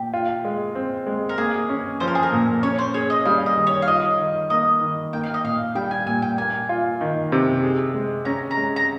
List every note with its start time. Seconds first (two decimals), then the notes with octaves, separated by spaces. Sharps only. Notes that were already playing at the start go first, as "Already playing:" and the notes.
Already playing: A#2 G4
0.14 F4
0.45 G#3
0.75 C4
1.07 G#3
1.29 A#4
1.38 A#3 G#4
1.69 C#4
2.00 F3 C5
2.08 A#4
2.15 G#4
2.23 A#4
2.32 A#2
2.63 C#4 C#5
2.79 C5
2.94 G#4 C#5
3.10 D#5
3.25 G3 F5
3.46 D#5
3.56 D#3
3.67 C#5
3.82 F5
3.87 F4 D#5
4.19 D#3
4.50 A#3 D#5
4.81 D#3
5.13 A#3 G5
5.23 F5
5.34 D#5
5.44 A#2 F5
5.75 G3 G5
5.91 G#5
6.06 A#2 G#5
6.22 G5
6.38 A#3 G#5
6.69 F4
7.01 D#3
7.32 C3
7.63 G#4
7.94 G#3
8.25 C#4 A#5
8.51 A#5
8.57 G#3
8.76 A#5